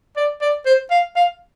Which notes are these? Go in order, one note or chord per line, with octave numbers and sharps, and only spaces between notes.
D5
D5
C5
F5
F5